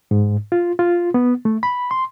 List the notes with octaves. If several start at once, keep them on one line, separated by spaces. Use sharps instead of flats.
G#2
F4
F4
B3
A3
B5
C6